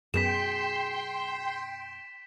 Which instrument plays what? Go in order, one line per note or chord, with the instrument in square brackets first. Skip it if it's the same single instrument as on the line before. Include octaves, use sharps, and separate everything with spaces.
[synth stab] F#2 B2 [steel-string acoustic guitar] G#4 [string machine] G5 C6 [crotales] B6 E7